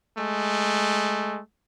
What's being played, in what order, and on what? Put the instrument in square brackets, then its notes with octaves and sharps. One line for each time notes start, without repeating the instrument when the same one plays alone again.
[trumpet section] G#3 A3